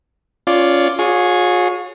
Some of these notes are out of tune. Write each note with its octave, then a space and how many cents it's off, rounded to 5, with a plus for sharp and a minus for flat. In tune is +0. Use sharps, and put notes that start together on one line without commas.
C#4 +15 F4 +0 D5 +0
F4 +45 G#4 +0 C#5 +0